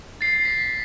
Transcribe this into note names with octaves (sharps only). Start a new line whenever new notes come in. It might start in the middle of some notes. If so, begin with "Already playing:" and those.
A6 C7
B6